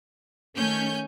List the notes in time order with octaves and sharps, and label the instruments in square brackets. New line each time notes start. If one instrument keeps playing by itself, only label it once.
[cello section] D#3 A3 C#4 [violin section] C#5 G#5 G6